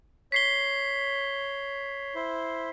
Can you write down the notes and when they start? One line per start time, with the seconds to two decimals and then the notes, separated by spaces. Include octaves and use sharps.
0.32 C#5 B6 C7 G7
2.15 E4 C5